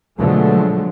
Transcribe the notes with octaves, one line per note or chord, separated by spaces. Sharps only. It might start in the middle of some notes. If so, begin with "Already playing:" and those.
B2 D3 F3 F#3 G#3 A3